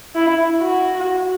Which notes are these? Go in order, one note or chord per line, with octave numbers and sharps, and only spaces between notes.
E4
F#4